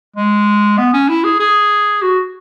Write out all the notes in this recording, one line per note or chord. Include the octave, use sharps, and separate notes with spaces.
G#3
B3
C#4
E4
G#4
G#4
F#4